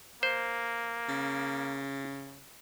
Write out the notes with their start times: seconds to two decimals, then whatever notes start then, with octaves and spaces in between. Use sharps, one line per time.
0.23 A#3 C5
1.08 C#3